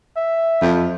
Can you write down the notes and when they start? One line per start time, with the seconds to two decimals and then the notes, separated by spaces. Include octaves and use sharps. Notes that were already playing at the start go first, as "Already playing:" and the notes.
0.17 E5
0.61 F2